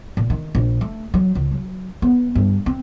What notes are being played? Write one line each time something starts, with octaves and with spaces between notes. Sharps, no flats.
A#2
D#3
A#1
A3
F#3
C#2
F#3
B3
G2
C4